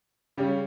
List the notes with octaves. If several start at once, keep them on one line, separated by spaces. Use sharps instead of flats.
C#3 G3 C#4